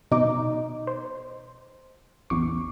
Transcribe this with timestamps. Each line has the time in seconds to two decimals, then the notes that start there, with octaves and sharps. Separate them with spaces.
0.11 B2 D#4 D6
0.87 C5
2.30 A1 E2 C#6 D6 C7